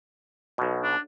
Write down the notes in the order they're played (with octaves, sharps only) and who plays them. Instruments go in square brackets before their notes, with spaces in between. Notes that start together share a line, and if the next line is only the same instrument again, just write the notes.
[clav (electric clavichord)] B1 B2
[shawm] D4